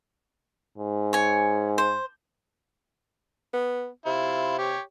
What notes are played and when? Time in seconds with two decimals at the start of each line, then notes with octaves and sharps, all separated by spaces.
0.78 G#2
1.13 C#5 G#5
1.78 C5
3.53 B3
4.06 C3 E4 F4
4.58 G4 C#5